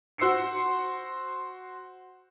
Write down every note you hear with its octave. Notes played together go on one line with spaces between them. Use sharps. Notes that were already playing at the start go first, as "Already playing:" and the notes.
F#4 C5 E6 C7 C#7